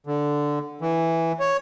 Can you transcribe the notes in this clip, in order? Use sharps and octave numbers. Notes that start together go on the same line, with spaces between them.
D3
E3
C#5